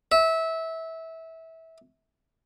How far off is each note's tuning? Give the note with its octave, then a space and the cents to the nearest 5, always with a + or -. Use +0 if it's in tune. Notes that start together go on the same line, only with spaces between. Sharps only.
E5 -20